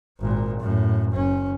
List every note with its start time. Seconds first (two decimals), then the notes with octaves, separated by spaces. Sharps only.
0.20 G#1 A#2
0.60 F#2 A2
1.12 F#1 C#4